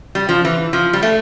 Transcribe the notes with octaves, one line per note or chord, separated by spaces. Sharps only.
G3
F3
E3
F3
G3
A3